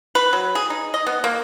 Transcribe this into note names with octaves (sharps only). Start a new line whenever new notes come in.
B4
F#3
G#4
D#4
D#5
B3
A#3